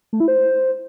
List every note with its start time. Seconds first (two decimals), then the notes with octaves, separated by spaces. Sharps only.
0.13 A3
0.20 E4
0.28 C5